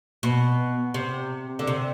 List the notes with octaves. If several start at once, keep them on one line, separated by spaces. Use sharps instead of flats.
B2
C3
D3
C3